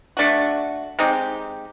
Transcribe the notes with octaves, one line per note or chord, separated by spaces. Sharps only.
A3 D4 F#4
G#3 C4 D#4 G4